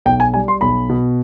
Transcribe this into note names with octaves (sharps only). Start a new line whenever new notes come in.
B1 G5
G#5
G3 G#5
C6
B1 B5
B2